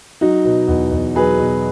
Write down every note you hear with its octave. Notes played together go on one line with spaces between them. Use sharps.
F#3 D#4 F#4
B2
E2
E2
F#3 G#4 B4
B2